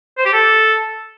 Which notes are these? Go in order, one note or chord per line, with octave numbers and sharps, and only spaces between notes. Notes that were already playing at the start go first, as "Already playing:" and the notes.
C5
G4
A4